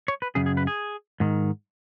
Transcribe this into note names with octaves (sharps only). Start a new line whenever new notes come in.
C#5
B4
F#2 C#3 G#4
G#4
B4
G#4
G#2 D#3